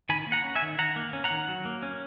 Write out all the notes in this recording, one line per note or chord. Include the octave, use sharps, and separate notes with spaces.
D#3 G#5 B5
A#3
F#5 A#5
C#4
E5 G#5
D#3
D#3 F#5 A#5
A#3
C#4
F#5 A#5
D#3
F#3
A#3
C#4